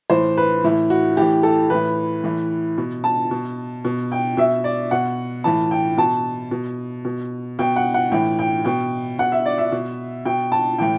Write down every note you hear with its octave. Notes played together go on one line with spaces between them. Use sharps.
A2 E3 C5
B4
A2 E3 E4
F#4
A2 E3 G4
A4
A2 E3 B4
A2 E3
B2
A5
B2
B2
G5
B2 E5
D5
B2 F#5
A2 E3 A5
G5
B2 A5
B2
B2
B2 G5
F#5
F#5
A2 E3 G5
G5
B2 G5
B2 F#5
E5
D5
E5
B2
B2 G5
A5
A2 E3 G5